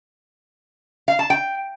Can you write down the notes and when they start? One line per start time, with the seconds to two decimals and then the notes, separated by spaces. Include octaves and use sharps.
1.08 F5
1.19 A5
1.30 G5